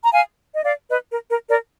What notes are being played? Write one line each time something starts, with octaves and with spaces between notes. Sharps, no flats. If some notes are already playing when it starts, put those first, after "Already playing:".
A#5
F5 G#5
D#5
D5 F5
B4 D#5
A#4
A#4
A#4 D5